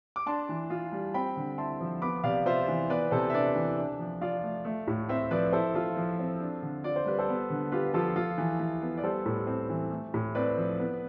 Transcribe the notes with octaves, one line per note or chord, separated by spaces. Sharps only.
D6
D4 A5 C6
E3
F4
G3
C4 G5 B5
D3
E4 A5 C6
F3
B3 B5 D6
C3 D5 F5
F4 C5 E5
E3
B3 B4 D5
C3 A4 C5
E5
D4 B4 D5
E3
D4
F3
F4 D5 F5
A3
A3
A2
C4 C5 E5
F3 B4 D5
E4 A4 C5
F3 F4 A4
F3
C4
D4
D3
F4 D5
C5
G3 B4
A4 C5
B3
D3
F4 G4 B4
F3 F4 A4
F4
E3
E3
B3
D5
G3 A4 C5
A2
C4
E3
A3
A2
C4 B4 D5
F3
B3